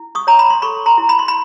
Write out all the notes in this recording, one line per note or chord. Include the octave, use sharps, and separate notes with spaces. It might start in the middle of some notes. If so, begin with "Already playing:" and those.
Already playing: E4
C#6 D#6
C#5 A#5
B5
C6
A4 B5 C#6
A#5 C6
E4
B5
C6
B5